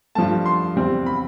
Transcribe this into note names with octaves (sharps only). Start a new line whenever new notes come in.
G2 F3 A3 A5
C6
E2 C3 G3 C4
B5